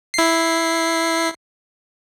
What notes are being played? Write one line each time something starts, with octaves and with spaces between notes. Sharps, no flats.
E4 C7